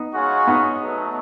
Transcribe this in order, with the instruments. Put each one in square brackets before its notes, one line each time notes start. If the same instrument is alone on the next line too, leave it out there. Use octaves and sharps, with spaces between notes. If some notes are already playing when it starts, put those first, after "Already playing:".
Already playing: [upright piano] B3 D#4
[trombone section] C#3 G#3 C#4 F#4
[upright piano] B3 D#4
[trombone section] B2 F#3 A3